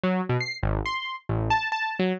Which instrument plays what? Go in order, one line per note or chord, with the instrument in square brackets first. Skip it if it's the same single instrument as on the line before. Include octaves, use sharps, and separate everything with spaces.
[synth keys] F#3
B2
C7
G#1
C6
A1
A5
A5
F#3